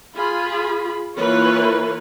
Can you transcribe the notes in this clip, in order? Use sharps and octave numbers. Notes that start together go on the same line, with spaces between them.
F4 G#4 B5
E3 A#3 F4 A#4 B4 C#5